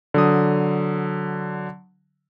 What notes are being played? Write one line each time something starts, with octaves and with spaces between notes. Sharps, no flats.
D3 F#3 D#6